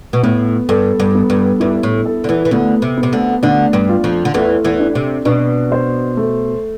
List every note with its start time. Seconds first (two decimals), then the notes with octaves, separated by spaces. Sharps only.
0.13 B2
0.23 A2 B3
0.69 G2 A4
1.00 G2
1.15 B3
1.30 G2
1.60 G2 E4
1.83 A2
2.06 A4
2.24 D3
2.29 E2 E3
2.45 E3
2.51 D2 D3 B3
2.82 C3
2.97 B3
3.03 C3
3.13 D2 D3
3.43 D2 D3 D4
3.73 G2 G3
3.89 F4
4.04 F2 F3
4.25 D3
4.34 E2 E3 A3
4.64 E2 E3
4.80 D4
4.95 C3
5.25 B2 D4
5.72 C5
6.17 A3